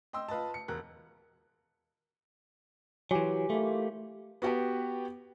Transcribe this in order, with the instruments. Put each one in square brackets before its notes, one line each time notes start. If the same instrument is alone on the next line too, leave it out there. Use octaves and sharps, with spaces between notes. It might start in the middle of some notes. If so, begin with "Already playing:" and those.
[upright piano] D#5 G5 C6 E6
F4 B4 D#5 A5
C#7
E1 A#4 F#6
[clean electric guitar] E3 F#3 [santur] G4 G#5 C6
[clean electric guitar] A3 [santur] A#3 E4 F4
[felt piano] B3 F#4 G4 B4 G5